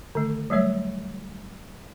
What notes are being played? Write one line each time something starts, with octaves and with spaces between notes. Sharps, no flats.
D3 D#3 A3
F#3 G3 A3 C#5 E5